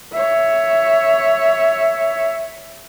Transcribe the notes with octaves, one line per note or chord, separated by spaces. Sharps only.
C#5 E5